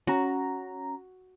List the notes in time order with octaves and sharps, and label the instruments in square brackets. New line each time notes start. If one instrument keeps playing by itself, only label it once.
[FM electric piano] C#4 A#5 [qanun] F#4